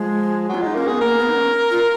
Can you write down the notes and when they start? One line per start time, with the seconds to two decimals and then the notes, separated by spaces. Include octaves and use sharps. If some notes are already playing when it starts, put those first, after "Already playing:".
Already playing: F3 G#3
0.49 F#3
0.54 F4
0.62 G#3 D#4
0.75 A#3 C#4
0.87 B3 G#4
1.01 A#3 A#4
1.19 B3
1.29 D#4
1.36 C#4
1.71 F4